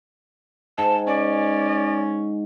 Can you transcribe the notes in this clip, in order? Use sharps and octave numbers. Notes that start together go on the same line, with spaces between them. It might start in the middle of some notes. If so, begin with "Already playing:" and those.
G#2 A5
C#4 D5